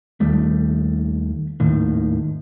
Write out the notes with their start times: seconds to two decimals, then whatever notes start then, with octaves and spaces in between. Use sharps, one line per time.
0.20 D#2 D#3 G3 A3
1.60 G#1 D#2 A2 D#3